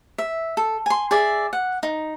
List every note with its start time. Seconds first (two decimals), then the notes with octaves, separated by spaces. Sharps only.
0.18 E5
0.57 A4
0.86 G#5 C6
1.11 G#4 D5 E5
1.53 F#5
1.83 D#4